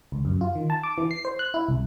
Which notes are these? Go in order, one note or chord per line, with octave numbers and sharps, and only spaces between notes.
C#2
F#2
F4
D#3
A5
D6
E3
C7
C5
F#6
E4
C2